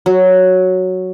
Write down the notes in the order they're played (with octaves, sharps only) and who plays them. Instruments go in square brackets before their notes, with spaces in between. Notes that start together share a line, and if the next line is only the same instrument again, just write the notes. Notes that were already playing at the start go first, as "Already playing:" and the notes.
[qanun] F#3